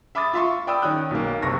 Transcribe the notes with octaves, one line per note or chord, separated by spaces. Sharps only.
E5 B5 D6 D#6 A6
F4 E5 C6 C#6
D5 G5 B5 D#6 E6
D#3 C#4 G5 D#6 F#6
B1 A#3
F#1 C3 C#6 A#6